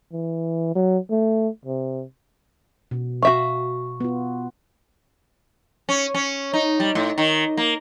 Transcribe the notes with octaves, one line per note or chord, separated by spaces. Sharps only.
E3
F#3
A3
C3
B2
F#4 E5 F5 C#6
B3 F4
C#4
C#4
D#4
G3
A2
D#3
A#3